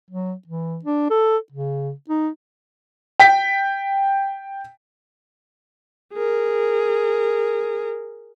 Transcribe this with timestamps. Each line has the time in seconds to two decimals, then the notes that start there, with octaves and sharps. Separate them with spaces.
0.11 F#3
0.48 E3
0.85 D4
1.11 A4
1.52 C#3
2.09 D#4
3.20 G5 B6
6.14 G#4 A#4